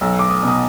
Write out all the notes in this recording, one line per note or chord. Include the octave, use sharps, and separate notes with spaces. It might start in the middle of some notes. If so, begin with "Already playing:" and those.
B1 E6
D6
D#6
B2 D#6